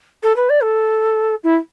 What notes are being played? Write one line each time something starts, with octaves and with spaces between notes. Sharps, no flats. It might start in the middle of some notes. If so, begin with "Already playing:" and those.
A4
B4
D5
A4
E4